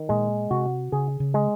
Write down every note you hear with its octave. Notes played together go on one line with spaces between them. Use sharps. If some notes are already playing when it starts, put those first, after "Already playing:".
Already playing: D#3
A#2 G#3
C3 F#4
C#3 G#4
C#3
G#3